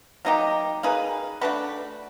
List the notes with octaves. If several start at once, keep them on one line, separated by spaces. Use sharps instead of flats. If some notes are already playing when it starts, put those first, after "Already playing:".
F#3 A#3 D#4 G4
A#3 D#4 G#4 B4
A3 D4 F#4 B4